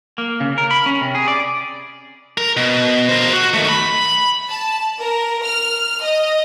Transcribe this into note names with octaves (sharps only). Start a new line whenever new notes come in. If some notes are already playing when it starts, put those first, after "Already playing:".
A#3
C#3
A#4
B5
C#4
C3
G#4
D5
A#4
B2
A#4 C5
F#4
D#3 A3
B5
A5
A#4
F6
D#5